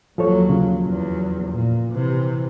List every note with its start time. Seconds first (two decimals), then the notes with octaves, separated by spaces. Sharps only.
0.18 D#2 F3 F#3 A4 C#5
0.49 C#3 F3
0.85 E2 F#3
1.51 A#2
1.92 C3 E3